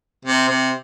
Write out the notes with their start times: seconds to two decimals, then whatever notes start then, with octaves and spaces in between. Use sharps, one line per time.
0.25 C3
0.48 C3